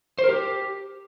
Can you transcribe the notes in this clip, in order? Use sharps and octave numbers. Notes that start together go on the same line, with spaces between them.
C5
A#4
G4